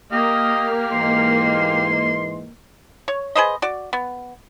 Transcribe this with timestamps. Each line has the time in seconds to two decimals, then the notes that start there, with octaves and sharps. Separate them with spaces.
0.12 A#3 G4 D#5 F5 F6
0.92 G#2 E3 D#5 C6
3.08 C#5
3.36 G#4 B4 C5 D#5
3.62 F#4 D5
3.93 B3